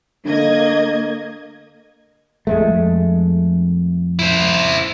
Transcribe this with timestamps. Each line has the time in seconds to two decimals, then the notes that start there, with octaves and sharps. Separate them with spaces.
0.25 D3 A#3 D#5 G#6
2.47 F2 G#3 A3
4.19 E4 C5